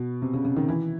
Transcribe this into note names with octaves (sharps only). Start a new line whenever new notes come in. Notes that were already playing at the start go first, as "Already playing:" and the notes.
Already playing: B2
C3
C#3
C#3
D#3
E3